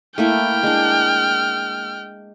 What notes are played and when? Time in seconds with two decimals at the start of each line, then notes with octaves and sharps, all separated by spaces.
0.18 A3 A#3 E4 G5 F6
0.63 G#3 D4